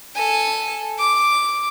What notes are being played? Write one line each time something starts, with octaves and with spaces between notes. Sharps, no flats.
A4 G#5
D6